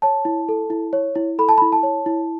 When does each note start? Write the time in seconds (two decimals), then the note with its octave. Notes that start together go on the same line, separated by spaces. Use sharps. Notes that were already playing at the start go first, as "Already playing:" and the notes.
0.02 C#5 A5
0.25 E4
0.49 A4
0.70 E4
0.93 C#5
1.15 E4
1.39 A4 B5
1.49 A5
1.58 E4 B5
1.72 A5
1.83 C#5
2.06 E4